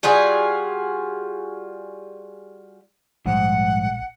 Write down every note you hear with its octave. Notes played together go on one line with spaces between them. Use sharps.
G3 F4 F#4 G#4
A#1 G#2 F3 G3 F#5